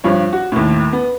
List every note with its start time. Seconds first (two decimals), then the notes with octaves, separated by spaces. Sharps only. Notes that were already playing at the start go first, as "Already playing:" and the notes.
0.04 G2 F3 C#5
0.33 F#4
0.52 D#2 A2
0.93 B3